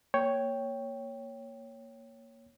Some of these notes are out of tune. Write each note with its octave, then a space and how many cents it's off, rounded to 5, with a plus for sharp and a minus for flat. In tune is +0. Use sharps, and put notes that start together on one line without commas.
A#3 +0 C#5 +0 G5 +0